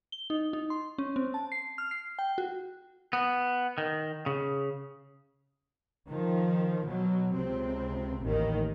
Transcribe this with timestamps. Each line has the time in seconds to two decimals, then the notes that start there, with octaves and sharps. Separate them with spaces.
0.12 G7
0.30 D#4
0.53 D#4
0.70 C6
0.98 C#4
1.16 C4
1.34 A5
1.52 C7
1.78 F6
1.91 C7
2.19 G5
2.38 F#4
3.13 B3
3.78 D#3
4.26 C#3
6.08 D#3 F3
6.87 B2 F#3
7.34 C#2 C3 C4
8.22 A1 D#2 D#3